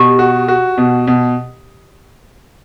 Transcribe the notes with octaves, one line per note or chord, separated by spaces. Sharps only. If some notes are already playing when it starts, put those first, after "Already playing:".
Already playing: B2 G4
F#4
F#4
B2
B2